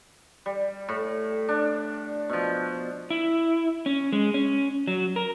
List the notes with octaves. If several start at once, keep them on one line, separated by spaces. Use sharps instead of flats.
G3
A2
D4
B2 F3
E4
C#4
G#3
C#4
F#3
A#4